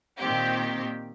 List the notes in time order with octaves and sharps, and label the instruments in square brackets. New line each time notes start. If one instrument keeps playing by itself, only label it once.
[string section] A#2 D#3 C4 G4